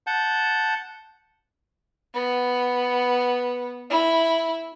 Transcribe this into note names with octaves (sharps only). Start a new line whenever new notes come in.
F#5 A5 G6
B3
E4